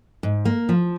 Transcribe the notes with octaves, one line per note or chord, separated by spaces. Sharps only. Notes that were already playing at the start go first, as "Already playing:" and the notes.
G#2
A#3
F3